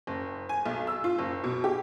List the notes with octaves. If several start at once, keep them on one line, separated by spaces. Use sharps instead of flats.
F#1
G#5
B1
E6
F4
F#1
B2
G4